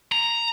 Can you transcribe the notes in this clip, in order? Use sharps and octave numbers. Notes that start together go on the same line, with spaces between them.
A#5